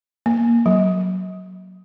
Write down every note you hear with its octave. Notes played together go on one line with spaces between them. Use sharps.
A#3
F#3